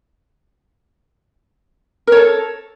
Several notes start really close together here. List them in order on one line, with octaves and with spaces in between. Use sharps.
A#4 C#5 A4